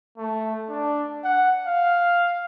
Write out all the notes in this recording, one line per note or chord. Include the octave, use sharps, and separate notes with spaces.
A3
D4
F#5
F5